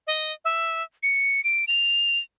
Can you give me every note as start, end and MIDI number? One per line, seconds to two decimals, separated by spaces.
0.07 0.32 75
0.45 0.83 76
1.03 1.43 97
1.44 1.65 98
1.68 2.19 101